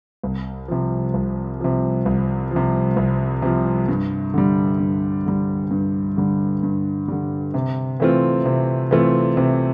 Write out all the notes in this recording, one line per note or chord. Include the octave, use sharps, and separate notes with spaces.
C2
C3 F3
C2
C3 F3
C2
F3
C3
C2
C3 F3
G2
D3 G3
G2
D3 G3
G2
D3 G3
G2
D3 G3
C3
E3 A3 C4 F4
C3
E3 A3 C4 F4
C3